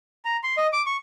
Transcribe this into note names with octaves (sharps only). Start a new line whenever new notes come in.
A#5
C6
D#5
D6
C#6